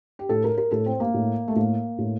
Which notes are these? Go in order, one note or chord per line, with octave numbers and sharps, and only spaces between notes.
G4
A2 A4
A#4
A#4
A2 A4
C4
A#3
A2
A3
A2 A#3
A2